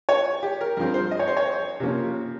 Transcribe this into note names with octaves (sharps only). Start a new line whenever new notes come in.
C#5
G4
A#4
G2 F3 C4 A#4
C5
D#5
C#5
C5
C#5
C3 F3 A#3 C#4